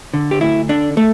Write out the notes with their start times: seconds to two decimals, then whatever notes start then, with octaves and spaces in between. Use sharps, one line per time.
0.14 D3
0.31 G4
0.41 D2 E4
0.69 D3 D4
0.97 A3